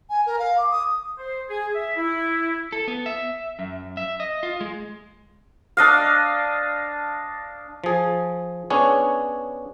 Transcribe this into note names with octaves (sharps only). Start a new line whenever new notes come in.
G#5
A#4
F5
D6
D#6
C5
G#4
E5
E4
A4
B3
E5
F#2
E5
D#5
F4
G#3
D4 D#5 F5
F3 G#4
B3 C#4 D4 G#4 C#5